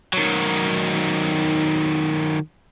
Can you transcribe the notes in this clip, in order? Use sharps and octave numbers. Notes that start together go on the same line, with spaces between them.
D#3 F#3